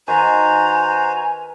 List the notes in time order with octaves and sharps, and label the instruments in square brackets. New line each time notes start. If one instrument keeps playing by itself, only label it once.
[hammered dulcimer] D#3 B4 C6 [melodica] F#4 C5 [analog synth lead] G#5 [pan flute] A#5